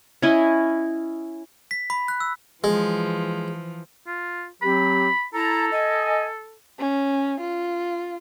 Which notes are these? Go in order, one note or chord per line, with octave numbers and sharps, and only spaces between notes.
C#4 E4 D#5
B6
B5
F#6
E6
E3 F3 G#3
F4
F#3 C4 G4 B5
E4 A4 A5 A#5
D#5 G#5
C#4
F4